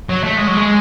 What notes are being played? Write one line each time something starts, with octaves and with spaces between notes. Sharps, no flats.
F#3
A3
G#3
F#3
G#3